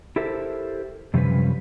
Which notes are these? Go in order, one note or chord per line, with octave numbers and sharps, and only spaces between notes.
E4 G4 A4 A#4 C5 E5
F#2 C3 F3 G3 C#4 B4